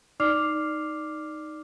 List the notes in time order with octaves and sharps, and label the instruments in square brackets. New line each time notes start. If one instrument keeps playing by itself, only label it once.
[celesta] D#4 D5 D6 F6 C7 F7